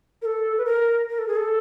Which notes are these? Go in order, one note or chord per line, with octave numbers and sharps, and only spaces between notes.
A#4
A4
B4
A#4
A#4
A4
G#4
A4